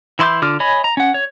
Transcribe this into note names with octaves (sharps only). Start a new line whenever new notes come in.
E3 E4 C6 D6 G6
D3 F4 D6 F6
C#5 D#5 G#5 B5
A#5
C#4 F#5
C#5